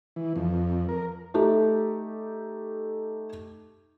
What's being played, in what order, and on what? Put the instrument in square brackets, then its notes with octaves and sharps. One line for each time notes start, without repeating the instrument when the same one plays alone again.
[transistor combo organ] E3
F2
A#4
[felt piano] A3 D#4 G4 A4